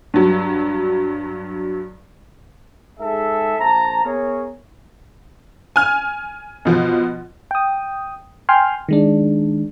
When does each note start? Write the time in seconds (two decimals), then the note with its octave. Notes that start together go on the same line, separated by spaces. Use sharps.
0.14 G2 F#3
3.00 G#2 G#4 A4 E5
3.60 A#1 C5 A5 A#5
4.05 B3 E4 G#4 A#4 C#5
5.76 G#5 F6
6.65 B2 F3
7.51 G5 D#6
8.49 G5 G#5 C6 F6
8.89 D#3 G#3 D4